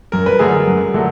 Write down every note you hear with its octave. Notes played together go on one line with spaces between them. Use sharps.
F#2 A#4
B4
D3 F#3 A3 G#4 A#4
F#2
D3 F#3 A3